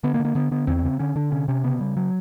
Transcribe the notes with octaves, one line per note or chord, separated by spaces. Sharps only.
D3 B3
A#3
D3
A#3
D3 B3
D3 B3
E2 C4
C#3
D3 C#4
D3 D4
C3 C#4
C3 C#4
C#3 B3
C#3 G3
F#3